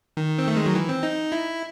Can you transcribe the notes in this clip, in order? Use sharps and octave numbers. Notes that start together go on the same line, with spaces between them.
D#3
C4
A3
G#3
F#3
E3
C4
D#4
E4